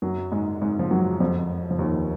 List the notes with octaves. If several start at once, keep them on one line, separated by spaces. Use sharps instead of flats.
F#2 F#3
G#2 G#3
G#2 G#3
F3
F#2 F#3
F2 F3
F3
D#2 D#3